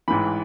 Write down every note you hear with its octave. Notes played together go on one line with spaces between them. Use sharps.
A1 G#2 E3 B5